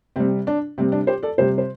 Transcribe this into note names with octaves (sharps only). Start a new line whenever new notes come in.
C3 G3 C4
D4
C3 G3 C4
D4
G4 C5
A4 D5
C3 G3 G4 C5
C5